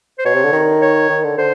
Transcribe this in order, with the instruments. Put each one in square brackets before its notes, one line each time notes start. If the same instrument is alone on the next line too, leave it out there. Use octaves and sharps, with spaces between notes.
[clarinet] C5
[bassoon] B2 [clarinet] C#5
[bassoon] C3
D3
D#3
[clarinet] C#5
[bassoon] D#3
D3
[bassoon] D3 [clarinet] C5